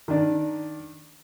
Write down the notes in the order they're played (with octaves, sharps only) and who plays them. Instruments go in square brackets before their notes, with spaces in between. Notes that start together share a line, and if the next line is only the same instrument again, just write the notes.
[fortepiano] D#3 D4